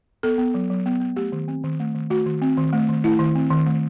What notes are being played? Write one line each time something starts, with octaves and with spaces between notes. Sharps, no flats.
B3 A4
B3
F#3
F#3
B3
B3
A3 G4
D#3
C4
D#3
A3
D#3
A3 F#4
D#3
C4
D#3
A3
D#3
A3 E4
D#3
C4
D#3
A3